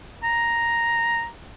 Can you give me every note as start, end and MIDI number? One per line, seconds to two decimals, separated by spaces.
0.23 1.27 82